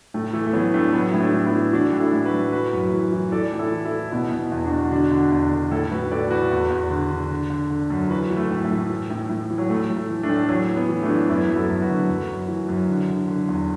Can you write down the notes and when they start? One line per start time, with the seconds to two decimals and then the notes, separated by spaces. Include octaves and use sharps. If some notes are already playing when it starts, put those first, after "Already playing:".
0.14 A2 A3
0.33 E3 A3
0.46 A3
0.53 E3 F#3 B3
0.73 A2 A3 D4
0.93 A2 F#3 B3
1.11 A2 E4
1.20 A3 D4
1.34 A2
1.46 B3 E4
1.53 E3
1.73 E3 D4 F#4
1.92 A2
2.00 E4 A4
2.13 A2
2.26 F#4 B4
2.33 A2
2.52 E3 F#4 B4
2.73 F#2
2.93 E3
3.13 E3
3.32 E3 A4 D5
3.52 A2
3.59 E4 A4
3.72 E3
3.85 E4 A4
3.92 E3
4.11 B2 B3 E4
4.32 B2
4.52 E2
4.65 D4 F#4
4.72 B2
4.91 D3 D4 F#4
5.12 D3
5.32 E2
5.51 D3
5.71 A2 E4 A4
5.91 A2 F#4 B4
6.11 A2 A4 D5
6.31 E3 F#4 B4
6.51 E2
6.70 E2
6.90 D3
7.11 D3
7.31 D3
7.50 D3
7.70 D3
7.90 F#2
8.10 E3 F#4 B4
8.31 E3
8.37 A3
8.51 A2
8.64 A3
8.70 A2
8.90 E3
9.10 A2
9.29 A2
9.50 E3
9.58 F#3
9.70 A2 A3
9.90 A2
9.96 A3
10.09 E3
10.23 A3 D4
10.30 A2
10.49 E3 F#3
10.69 E3
10.76 F#3 B3
10.89 E3
11.03 A3 D4
11.09 E3
11.29 F#2 B3 E4
11.49 F#2
11.56 E4 A4
11.69 F#2
11.82 F#4 B4
11.89 D3
12.09 F#2
12.29 F#2
12.48 E3
12.68 F#2
12.89 D3
13.08 D3
13.28 D3
13.48 E2